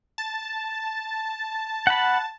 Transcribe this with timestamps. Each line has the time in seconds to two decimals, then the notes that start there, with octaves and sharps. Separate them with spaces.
0.18 A5
1.87 F#5 B5